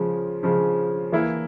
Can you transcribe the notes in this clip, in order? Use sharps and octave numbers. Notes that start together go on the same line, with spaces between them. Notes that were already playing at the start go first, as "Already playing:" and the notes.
Already playing: C#3 F3 G#3
C#3 F3 G#3
E3 A#3 E4